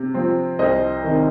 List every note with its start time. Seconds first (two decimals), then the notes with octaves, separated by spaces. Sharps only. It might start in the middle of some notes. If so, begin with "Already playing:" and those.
Already playing: C3
0.14 F3 C4
0.59 C2 C5 D#5
1.04 C3 D#3